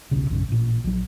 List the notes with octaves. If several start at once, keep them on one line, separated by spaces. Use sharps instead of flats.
D#1 B1 C#3
A#1 F#2 C#3
A1 A#2
A#1 F#3